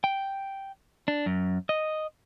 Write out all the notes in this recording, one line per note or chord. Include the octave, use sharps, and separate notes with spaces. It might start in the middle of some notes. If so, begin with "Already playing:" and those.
G5
D4
F#2
D#5